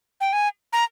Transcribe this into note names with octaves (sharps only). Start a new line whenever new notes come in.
G5
G#5
A#5